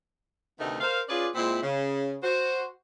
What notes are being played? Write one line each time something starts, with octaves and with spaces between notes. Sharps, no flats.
D2 C3 D#3 A3 B3 D#4
A#4 C5 F5
C#4 F4 G#4 B4 D5
A#2 G#3 C4 E4
C#3
F#4 C5